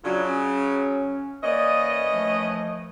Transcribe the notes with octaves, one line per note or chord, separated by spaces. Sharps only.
C#3 F#3 D4 F4
C#4
E3 A#3 C#4 D5 D#5
D#2 F3 A3